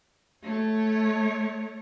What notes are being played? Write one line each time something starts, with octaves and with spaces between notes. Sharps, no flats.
A3 C#5